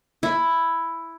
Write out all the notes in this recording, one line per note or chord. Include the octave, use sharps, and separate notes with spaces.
E4